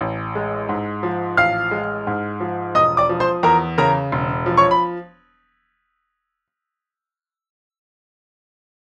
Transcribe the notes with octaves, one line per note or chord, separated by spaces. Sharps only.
A1
G#3
G#2
F3
A1 F5 F6
G#3
G#2
F3
E1 D#5 D#6
D5 D6
F3
C5 C6
E2 A#4 A#5
C#3 A#4 A#5
E1
F3
C#5 C#6
B5